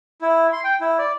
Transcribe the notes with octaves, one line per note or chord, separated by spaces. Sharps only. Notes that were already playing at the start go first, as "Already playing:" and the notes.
E4
C6
G5
E4
D5